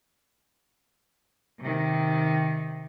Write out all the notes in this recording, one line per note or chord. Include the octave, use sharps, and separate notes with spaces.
C3 D#3